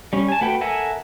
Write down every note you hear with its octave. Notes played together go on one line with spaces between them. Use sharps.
G3 C#4
G#5 A5
A3 F#4 B4 G5
A4 A#4 E5 F#5 G#5